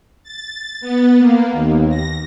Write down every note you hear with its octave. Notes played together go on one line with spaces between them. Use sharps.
A6
B3
A#3
D#2
A#6